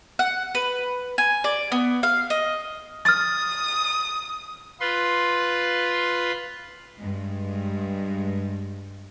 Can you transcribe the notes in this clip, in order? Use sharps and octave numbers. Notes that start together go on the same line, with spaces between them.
F#5
B4
G#5
D5
B3
F5
D#5
D#6 F6 A6
F4 B4 C6
G2 G#3